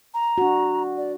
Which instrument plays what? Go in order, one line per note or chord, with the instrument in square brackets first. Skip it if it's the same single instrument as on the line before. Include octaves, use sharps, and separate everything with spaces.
[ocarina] A#5
[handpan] D4 F#4
[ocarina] D5